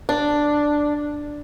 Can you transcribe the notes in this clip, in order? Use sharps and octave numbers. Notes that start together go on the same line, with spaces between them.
D4